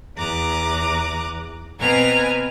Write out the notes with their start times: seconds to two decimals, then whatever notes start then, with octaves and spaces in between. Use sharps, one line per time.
0.17 E2 A#5 D6 D#6 F#6
1.80 B2 C4 B4 G#5 A#5 F6